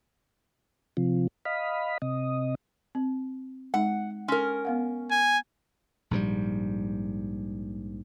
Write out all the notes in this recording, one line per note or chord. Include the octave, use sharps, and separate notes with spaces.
C3 F3
D#5 F5 B5
C3 D#5
C4
G#3 D#4 F#5
C#4 A#4 C6
B3 F5 F#5
G#5
A#1 G#2 B2 G3